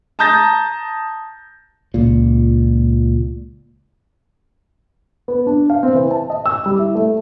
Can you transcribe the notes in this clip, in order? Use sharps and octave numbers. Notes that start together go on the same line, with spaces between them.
A5 A#5 D#6 G6 A6 A#6
C#2 A#2
B3
D4
F5
C4
E3
A5
D#5
E6
G3
E4
A3